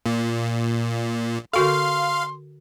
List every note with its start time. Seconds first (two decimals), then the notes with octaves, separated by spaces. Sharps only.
0.06 A#2
1.54 D3 F#4 A4 F5 C6